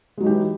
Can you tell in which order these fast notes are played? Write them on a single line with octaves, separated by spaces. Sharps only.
G#3 F#3 D#4 G4 E3